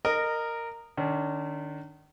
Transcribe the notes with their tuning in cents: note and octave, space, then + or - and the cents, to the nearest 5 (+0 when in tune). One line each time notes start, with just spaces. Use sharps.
A#4 -10 D#5 -20
D#3 -35 C#4 +40